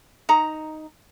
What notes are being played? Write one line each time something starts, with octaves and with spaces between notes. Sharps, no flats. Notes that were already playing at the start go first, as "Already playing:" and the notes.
D#4 A#5